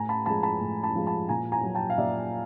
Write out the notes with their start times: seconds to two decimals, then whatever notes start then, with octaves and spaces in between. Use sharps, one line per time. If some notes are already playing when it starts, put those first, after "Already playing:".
Already playing: A2 G#5 A#5
0.09 A5 B5
0.26 F3 G#3 A5 B5
0.43 A5 B5
0.61 A2
0.83 A5 B5
0.95 F3 G#3
1.07 A5 B5
1.29 A#2 G#5 A#5
1.52 G#5 A#5
1.64 F#3
1.75 G5 A5
1.90 F5
1.98 A#2 D5 E5